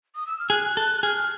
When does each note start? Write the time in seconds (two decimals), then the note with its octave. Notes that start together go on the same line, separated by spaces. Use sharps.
0.15 D#6
0.27 E6
0.39 F6
0.50 G#4 F#6
0.77 A4
1.03 G#4 F6